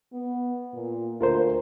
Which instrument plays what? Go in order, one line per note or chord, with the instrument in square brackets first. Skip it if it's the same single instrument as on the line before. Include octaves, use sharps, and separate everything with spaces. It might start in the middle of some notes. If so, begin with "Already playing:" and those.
[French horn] B3
A#2
[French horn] D2 [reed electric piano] F4 A#4 C5